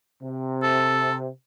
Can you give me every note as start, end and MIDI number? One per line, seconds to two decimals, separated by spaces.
0.22 1.29 48
0.63 1.14 69